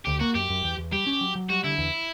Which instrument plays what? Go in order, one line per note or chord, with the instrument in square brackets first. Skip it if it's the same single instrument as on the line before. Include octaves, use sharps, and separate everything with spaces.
[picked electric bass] D2 [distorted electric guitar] G4
[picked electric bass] A#3 [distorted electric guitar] F#4
[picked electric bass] F#2 [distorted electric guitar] G4
[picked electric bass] F#2
E2
E2
[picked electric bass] G3 [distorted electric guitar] G4
[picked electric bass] C#4
F#3
F#3
[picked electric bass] G3 [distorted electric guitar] F#4
[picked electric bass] D3 [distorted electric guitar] E4
[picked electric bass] E2